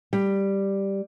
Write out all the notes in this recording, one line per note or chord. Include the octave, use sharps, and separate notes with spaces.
G3